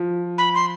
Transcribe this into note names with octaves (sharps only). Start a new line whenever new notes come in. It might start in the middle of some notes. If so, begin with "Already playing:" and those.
Already playing: F3
B5
C6